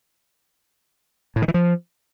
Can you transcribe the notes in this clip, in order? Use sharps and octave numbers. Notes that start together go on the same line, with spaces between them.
A2
D#3
E3
F3